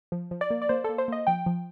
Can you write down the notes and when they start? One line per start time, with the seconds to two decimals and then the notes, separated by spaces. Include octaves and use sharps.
0.12 F3
0.31 F3
0.41 D5
0.50 A#3
0.62 D5
0.69 A#3 C5
0.84 A#3 A4
0.98 C5
1.08 A#3 D#5
1.27 F3 G5
1.46 F3